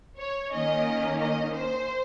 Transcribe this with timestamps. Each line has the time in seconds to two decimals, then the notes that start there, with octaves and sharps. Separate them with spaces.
0.17 C#5
0.50 D#3 A#3 C#4 D#5
1.18 D#5
1.52 C5